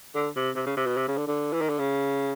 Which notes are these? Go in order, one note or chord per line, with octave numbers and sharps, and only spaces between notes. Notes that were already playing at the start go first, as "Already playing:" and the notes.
D3
C3
C3
C#3
C3
B2
C3
C#3
D3
D3
E3
D#3
D3
C#3